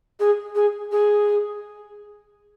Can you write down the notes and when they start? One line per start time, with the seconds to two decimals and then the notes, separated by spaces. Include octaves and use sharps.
0.20 G#4
0.55 G#4
0.92 G#4